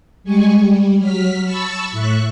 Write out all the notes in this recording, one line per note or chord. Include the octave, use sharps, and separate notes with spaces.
G3 G#3 G#5 C#6
G3
F#3 F6 B6
A5 B5 C#6 E6 A6 B6
A2 E5 C#6 F#6